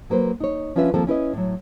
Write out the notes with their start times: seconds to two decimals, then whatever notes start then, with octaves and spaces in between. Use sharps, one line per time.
0.10 F#3 A#3 B4 C5
0.40 D#4 C#5
0.76 F3 C#4 D4 F4 B4 E5
0.94 D#2 F3 A#3 C4 A4
1.07 C#4 E4 B4 D#5
1.33 A2 F#3